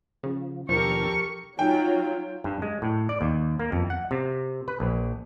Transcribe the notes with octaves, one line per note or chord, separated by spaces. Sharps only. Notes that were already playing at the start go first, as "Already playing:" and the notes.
C#3 F3
D#2 B2 F3 D4 G4 A4 A#4 C#6
F#3 D#4 F4 G5
G2
G#3
A2
D5
D#2
A#3
F2
F#5
C3
B4
A#1